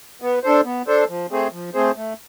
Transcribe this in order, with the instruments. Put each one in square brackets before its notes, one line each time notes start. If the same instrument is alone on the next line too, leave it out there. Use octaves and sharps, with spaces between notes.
[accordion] B3
D4 A4 C5
B3
D4 A4 C5
F3
A3 C4 G#4 C5
F3
A3 C4 G#4 C5
A3